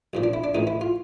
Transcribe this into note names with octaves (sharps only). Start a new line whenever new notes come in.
B1 A#2 F3
D4
E4
D4
A1 A2 E3 D#4
E4
F4